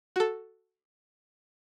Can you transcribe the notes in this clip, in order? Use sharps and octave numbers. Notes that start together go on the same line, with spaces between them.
F#4 A4